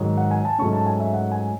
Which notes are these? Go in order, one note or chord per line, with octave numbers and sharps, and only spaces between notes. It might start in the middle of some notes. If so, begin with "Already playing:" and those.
Already playing: G#2 D#3 F#3
F#5
G#5
A5
G#2 F#3 A3 C#4 C#6
A5
G#5
E5
F#5
G#5